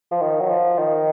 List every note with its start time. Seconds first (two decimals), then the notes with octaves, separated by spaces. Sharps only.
0.11 F3
0.22 D#3
0.41 F#3
0.50 F3
0.78 D#3